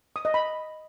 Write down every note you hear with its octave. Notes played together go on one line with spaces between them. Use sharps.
D#6
D#5
B5